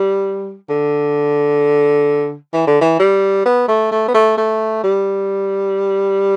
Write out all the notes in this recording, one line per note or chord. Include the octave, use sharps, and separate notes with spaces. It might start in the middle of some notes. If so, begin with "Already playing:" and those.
Already playing: G3
D3
E3
D3
E3
G3
B3
A3
A3
B3
A3
A3
G3